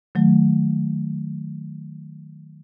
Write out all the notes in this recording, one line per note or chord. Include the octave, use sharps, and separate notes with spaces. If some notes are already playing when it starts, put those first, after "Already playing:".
D#3 F#3 A3